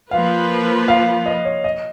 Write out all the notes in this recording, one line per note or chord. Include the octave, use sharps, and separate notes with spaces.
F3 A#3 F4 B4 F5
F5
D#5
C#5
D#5